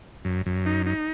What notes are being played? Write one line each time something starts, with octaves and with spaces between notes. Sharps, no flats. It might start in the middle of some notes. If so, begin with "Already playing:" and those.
F#2
F#2
D#4
D#4